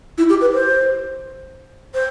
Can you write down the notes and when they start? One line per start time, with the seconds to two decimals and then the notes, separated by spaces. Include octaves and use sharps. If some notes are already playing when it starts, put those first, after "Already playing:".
0.18 E4
0.29 G4
0.41 B4
0.53 C5
1.94 C5